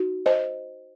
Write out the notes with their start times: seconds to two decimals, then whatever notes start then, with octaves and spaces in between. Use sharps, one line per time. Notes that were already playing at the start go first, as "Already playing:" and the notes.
Already playing: D#4 F#4
0.26 C5 D#5